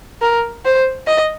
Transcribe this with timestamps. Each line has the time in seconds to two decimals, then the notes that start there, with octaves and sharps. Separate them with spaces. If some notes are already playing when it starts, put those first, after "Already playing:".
0.22 A#4
0.65 C5
1.07 D#5